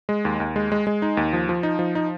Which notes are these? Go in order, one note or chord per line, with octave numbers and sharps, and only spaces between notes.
G#3
D#2
D#2
G#3
G#3
G#3
D#4
D#2
F3
F3
D#4
F3
D#4